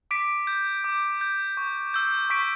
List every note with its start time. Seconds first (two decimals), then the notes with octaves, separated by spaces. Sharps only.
0.11 D6 B6 D7
0.47 G6
0.84 D6
1.21 G6
1.57 C#6
1.94 E6 G6
2.30 C#6 B6 D7